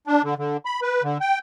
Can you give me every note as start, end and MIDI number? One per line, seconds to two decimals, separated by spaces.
0.07 0.22 62
0.24 0.34 50
0.38 0.57 50
0.65 0.80 83
0.82 1.03 71
1.03 1.18 50
1.21 1.39 79